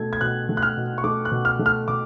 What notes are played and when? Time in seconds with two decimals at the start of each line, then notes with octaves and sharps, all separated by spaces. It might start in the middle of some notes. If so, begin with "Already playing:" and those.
Already playing: B2 A3 G#6
0.13 G#6
0.21 B2 F#6
0.49 A3
0.57 F#6
0.62 F6
0.77 B2
0.98 C#6
1.04 A3 D6
1.25 F#6
1.31 B2
1.45 F6
1.59 A3
1.66 F6
1.88 B2 D6